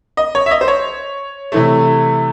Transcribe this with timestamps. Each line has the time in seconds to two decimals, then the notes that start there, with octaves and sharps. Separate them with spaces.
0.17 D#5
0.35 C#5
0.46 E5
0.51 D#5
0.61 C5
0.68 C#5
1.52 C3 E3 A3